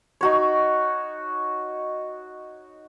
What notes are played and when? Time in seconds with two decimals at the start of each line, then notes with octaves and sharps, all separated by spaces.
0.21 D#4 F#4 C#5